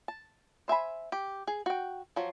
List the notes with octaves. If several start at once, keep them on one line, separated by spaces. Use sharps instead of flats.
A5
C5 E5 G#5 B5
G4
G#4
F#4 G5
F3 F#3